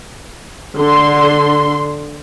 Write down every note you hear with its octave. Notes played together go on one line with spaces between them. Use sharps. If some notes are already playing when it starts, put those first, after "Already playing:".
D3 C6